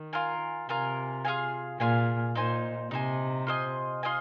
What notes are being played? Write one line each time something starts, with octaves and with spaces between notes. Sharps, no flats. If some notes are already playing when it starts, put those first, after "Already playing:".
Already playing: D#3
F4 A#4 G#5
C3 F4 A#4 G#5
F4 G#4 F5 G#5
A#2 F4 G#4 F5 G#5
A#2 D#4 C5 G#5
C3 D#4 C5 G#5
F4 C5 D#5 G#5
F4 C5 D#5 G#5